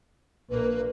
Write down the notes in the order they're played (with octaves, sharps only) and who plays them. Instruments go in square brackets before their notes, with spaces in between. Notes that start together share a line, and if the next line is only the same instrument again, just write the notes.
[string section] A#1 A#3 [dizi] B4